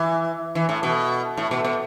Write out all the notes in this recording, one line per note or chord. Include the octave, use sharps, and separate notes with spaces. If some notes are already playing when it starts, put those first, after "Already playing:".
Already playing: E3
E3
A2
B2
A2
B2
B2